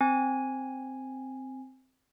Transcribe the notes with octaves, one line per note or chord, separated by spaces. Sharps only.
C4 G#5